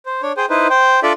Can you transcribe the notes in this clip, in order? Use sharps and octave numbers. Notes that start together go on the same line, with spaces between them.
C5
D4 C#5
G#4 C5 G5
D#4 E4 B4 C5
C5 G5
D4 F4 A4 D5 E5